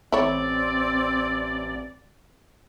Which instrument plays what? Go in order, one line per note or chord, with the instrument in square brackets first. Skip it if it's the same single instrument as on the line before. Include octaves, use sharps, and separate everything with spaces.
[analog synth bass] A1 [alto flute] C4 [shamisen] E4 C#5 [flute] D5